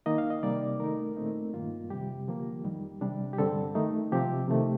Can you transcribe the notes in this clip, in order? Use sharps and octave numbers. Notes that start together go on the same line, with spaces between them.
D#3 A#3 D#4 D#5
F5
D#5
C3 G3 A#3 D#4 D5
D#3 A3 D#4 A#4
A#2 A3 C4 D#4
G2 D#3 A#3 F4
F2 C3 G3 G4
D3 F3 A#3
F2 D#3 G3
C3 G3 D4
G4
G2 D3 G3 C4 A4
D#3 A3 D#4
C3 F3 C4 G4
C3 D#3 A3